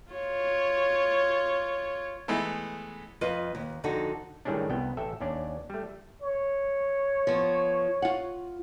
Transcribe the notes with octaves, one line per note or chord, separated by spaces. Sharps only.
F4 C#5
E3 G#3 A3 B3 A4
F2 F4 B4 D#5
D#2
F2 D3 D#4 F#4 A4
A2 D#3 G3 G#3 C#4 D4
C2 B3 G5
A1 A4 E5 G5
D#2 C#4 D4 D5
G3 A3
C#5
F3 B3
F4 F#5